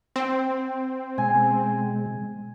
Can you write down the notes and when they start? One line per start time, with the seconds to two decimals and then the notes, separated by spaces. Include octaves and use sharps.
0.16 C4
1.18 B2 G#3 G#5